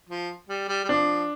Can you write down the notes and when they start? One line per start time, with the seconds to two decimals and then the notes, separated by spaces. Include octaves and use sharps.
0.09 F3
0.49 G3
0.68 G3
0.84 G3
0.89 F3 D4